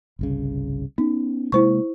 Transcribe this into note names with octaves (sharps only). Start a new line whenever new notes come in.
G1 C2 C#3
B3 C#4 D#4
C3 G#3 A#3 E4 C5 C#6